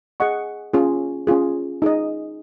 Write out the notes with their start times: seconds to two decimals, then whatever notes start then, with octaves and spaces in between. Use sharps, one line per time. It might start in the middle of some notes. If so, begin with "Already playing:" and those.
0.20 G#4 D#5 F#5 C#6
0.74 C#4 F4 G#4
1.27 C#4 F4 G#4
1.82 D#4 G#4 D#5